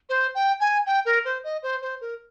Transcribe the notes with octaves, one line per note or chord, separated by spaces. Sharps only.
C5
G5
G#5
G5
A#4
C5
D#5
C5
C5
A#4